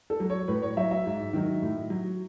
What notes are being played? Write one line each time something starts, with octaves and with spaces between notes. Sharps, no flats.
A4
F#3
C#5
A2 B4
C#5
F#3 E5
E5
G#2
D#3 F#3
A2
F#3